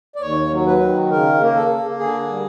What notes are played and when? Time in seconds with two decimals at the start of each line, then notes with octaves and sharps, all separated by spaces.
0.16 D5
0.21 D#2 C#5
0.52 F#3
0.67 B4
0.81 D#3
1.10 C#3 A#4
1.41 A#3
1.56 A4
1.70 A#3
1.99 D3 G#4
2.29 G3